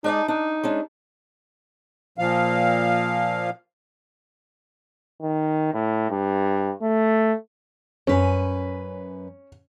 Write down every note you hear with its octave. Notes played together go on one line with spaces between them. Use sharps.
G#3 D#4 D5 A5
D4 D#4
G#3 C#4 D4
A#2 F3 F5
D#3
A2
G2
A3
F#2 C#4 B4 G#5